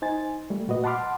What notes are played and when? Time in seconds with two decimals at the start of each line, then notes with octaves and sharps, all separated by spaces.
0.02 D#4 C5 G#5 A6
0.50 G3 A3
0.68 A#2 F#4 B4 D#5
0.84 F#5 A5 B5 C6 D6 F6